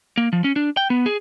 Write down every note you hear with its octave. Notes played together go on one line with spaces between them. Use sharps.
A#3
F3
C#4
D4
G5
B3
G#4